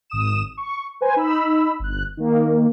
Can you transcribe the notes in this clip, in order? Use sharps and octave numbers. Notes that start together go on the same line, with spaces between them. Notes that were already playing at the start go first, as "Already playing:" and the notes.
G#1 D#6 E7
C#6
B4 C5 G#5
D#4 B5 E6
G1 F#6
D#3 A#3